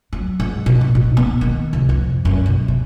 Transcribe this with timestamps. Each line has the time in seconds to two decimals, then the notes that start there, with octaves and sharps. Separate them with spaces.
0.13 F#3
0.40 G#2
0.66 B2
0.81 A2
0.95 D#4
1.17 B3
1.41 D#3
1.73 C2
1.89 F2
2.25 F#2
2.46 B1
2.68 B2